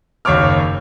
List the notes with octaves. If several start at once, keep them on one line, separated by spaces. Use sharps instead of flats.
F#1 D#2 C#5 C#6 D6 F6